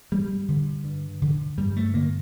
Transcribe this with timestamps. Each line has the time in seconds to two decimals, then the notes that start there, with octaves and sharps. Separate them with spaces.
0.12 G2 G3
0.49 D3
0.84 G2
1.22 D3
1.57 G2 G3
1.77 A3
1.94 D3 A#3